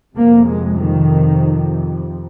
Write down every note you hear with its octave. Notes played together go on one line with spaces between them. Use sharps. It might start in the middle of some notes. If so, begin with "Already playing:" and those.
F2 C3 A#3
G#3
D#3